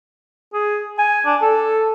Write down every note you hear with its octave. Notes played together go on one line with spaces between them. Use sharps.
G#4
G#5
D4
A4